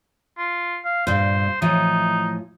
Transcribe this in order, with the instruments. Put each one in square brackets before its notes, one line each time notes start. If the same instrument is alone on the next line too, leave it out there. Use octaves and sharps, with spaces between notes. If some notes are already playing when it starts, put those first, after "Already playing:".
[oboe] F4
F5
[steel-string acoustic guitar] G2 A#2 [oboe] C5
[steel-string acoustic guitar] A2 E3 F3 [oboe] D#4